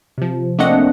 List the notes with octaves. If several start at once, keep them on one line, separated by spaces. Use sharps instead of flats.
C3 F3
A3 A#3 C4 D4 D#5 F#5